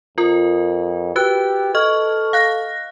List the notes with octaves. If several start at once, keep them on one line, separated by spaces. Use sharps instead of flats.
F2 F4 A#4
F#4 G4 B4 F#6
A4 D#5 C#6 F6
F5 F#6 A#6